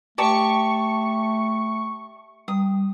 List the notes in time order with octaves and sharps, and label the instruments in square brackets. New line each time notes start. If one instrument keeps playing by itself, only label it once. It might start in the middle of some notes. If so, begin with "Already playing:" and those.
[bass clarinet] A3 [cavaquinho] G4 D5 A5 [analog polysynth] C#6
[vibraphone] G3 [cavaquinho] D#6